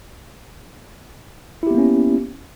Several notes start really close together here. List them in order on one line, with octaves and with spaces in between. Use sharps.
E4 G4 B3 A#3 C#4